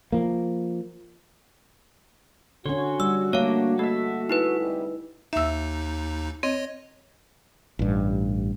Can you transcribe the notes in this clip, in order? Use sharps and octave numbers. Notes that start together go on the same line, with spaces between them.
F3 A#3
D3 C#4 F#4 C#5 C6
G3 E6
A3 A#3 D4 C#5 F5
A#3 A4 E5
D#4 E4 B4
C3 G3 G#3
D#2 D#4 E5 E6
C4 C#5 D#5
A1 G2